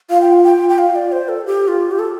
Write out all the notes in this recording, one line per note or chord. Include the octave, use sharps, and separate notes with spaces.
F4 F5
G5
F5
G5
G5
F5
D5
C5
A4
G4
F4
G4
A4